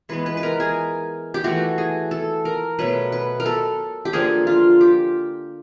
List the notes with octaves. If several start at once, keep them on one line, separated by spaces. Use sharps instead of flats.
E3 G#3 B3 B4
B4
B4
A#4
G#4
G4
E3 A3 F#4
G#4
A4
A#4
B2 F#3 A3 B4
B4
A#4
A4
G4
D3 F3 A#3 G#4
F4
G4